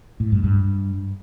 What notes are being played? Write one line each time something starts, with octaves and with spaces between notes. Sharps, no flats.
A2
G2
G2